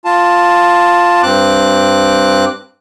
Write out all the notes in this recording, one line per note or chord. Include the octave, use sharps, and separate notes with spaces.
F4 A5
G2 C4 D6 F#6